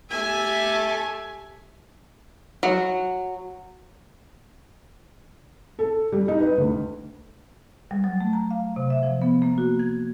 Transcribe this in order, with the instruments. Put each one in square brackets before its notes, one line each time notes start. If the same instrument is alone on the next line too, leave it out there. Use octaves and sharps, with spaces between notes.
[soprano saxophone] A3 [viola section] G4 E5 G#5
[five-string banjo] F#3
[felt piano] A4
G3
D#4
B4
D2
[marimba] G3
F#3
A3
A#5
F5
C3
E5
F3
B3
A#3
F#4
G#6